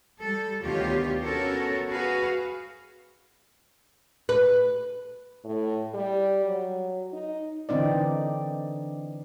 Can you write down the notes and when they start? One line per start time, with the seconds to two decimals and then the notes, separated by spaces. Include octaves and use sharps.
0.21 G3 A4
0.63 D2 B2 D#3 F4 G4 C#5
1.22 B3 C#4 F#4 A4 A#4 C#5
1.90 F#4 G#4 B4 F5
4.29 B4
5.44 A2
5.94 G3
6.45 F#3
7.13 D#4
7.69 D3 E3 C4 D#4 D5